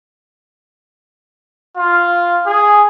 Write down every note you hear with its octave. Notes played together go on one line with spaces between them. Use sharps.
F4
G#4